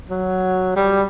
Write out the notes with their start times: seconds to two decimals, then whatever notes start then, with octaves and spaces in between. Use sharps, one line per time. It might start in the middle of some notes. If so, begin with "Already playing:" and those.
0.10 F#3
0.76 G3